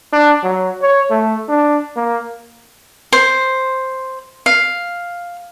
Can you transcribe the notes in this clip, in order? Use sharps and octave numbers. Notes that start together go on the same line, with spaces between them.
D4
F#3
C#5
A3
D4
A#3
C5
F5